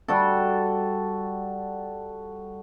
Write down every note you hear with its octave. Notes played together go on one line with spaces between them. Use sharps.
G3 F#4 A4